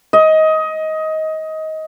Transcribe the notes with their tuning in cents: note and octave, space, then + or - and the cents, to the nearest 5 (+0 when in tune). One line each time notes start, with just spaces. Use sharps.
D#5 +20